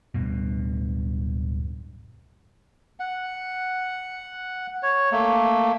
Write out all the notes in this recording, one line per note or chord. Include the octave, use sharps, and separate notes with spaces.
D1 G2 B2
F#5
C#5
A3 A#3